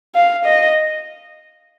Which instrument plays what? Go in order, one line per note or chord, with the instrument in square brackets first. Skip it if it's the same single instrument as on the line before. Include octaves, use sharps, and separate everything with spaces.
[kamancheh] F5
D#5